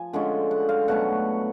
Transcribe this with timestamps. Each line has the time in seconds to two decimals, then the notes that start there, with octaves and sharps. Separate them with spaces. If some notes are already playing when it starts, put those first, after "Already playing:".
Already playing: F3 G#5
0.13 D3 G#3 C#4 F4
0.51 F#5
0.69 F5
0.88 B2 F#3 A3 C#4 F#5